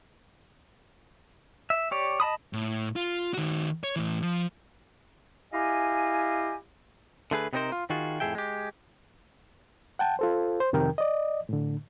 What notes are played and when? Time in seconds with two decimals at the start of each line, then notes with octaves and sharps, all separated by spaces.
1.70 E5
1.91 G4 C#5 D5
2.20 D#5 A5 B5 D#6
2.53 A2
2.96 F4
3.34 D#3 F#4
3.84 C#5
3.96 A2 E3
4.23 F3
5.52 E4 G4 D#5 F5 G#5
7.31 D3 A3 G#4 B4
7.53 C3 B3 C4 D#4 A#4 C5
7.72 F4
7.90 D#3 F4 F#4 G#4
8.20 F2 A2 F3 G#4 E5 G5
8.35 G#3 G4
9.99 F#5 G5 A5
10.19 F4 A4 C5
10.60 C5
10.73 F2 C3 D#3 A#4 G5
10.98 D5 D#5
11.49 A2 D3